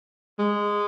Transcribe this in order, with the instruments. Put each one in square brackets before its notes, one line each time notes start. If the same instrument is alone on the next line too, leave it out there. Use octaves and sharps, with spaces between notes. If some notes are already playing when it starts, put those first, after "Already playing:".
[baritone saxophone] G#3